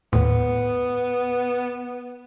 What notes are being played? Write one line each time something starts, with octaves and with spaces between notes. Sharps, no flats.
D#2 A2 B3